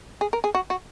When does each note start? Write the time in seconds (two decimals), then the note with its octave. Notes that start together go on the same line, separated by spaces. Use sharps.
0.21 G#4
0.33 A#4
0.44 G#4
0.55 F#4
0.70 F#4